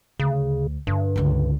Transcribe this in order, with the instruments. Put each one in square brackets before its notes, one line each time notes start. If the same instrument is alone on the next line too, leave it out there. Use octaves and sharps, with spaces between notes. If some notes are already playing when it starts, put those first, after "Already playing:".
[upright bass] D2 [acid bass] C#3
[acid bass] G2 [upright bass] D3
[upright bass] C#2 D3